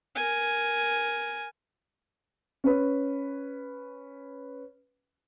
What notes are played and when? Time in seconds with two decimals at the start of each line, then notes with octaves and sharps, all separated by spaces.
0.16 A#4 G#5
2.64 C#4 B4